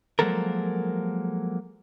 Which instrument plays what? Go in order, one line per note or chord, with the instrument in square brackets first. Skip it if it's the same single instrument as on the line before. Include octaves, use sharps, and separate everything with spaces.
[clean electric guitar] F3 F#3 G#3 A#3 A4 A#4